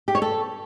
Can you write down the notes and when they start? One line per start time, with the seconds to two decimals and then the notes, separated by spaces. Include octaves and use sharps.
0.08 G4
0.15 C#5
0.22 A4